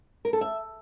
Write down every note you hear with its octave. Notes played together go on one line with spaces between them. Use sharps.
A#4
A4
E5